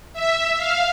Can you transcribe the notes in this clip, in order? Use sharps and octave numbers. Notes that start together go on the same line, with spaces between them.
E5
F5